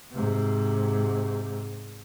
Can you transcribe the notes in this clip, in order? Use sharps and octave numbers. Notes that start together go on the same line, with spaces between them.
G#2 C3